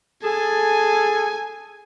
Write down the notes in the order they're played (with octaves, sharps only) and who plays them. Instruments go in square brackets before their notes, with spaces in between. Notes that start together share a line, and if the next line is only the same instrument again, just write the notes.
[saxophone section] G#4 A4 [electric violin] G#5